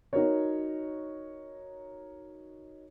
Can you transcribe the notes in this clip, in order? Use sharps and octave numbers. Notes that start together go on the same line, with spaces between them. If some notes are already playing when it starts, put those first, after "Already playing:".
D#4 F#4 A#4 C#5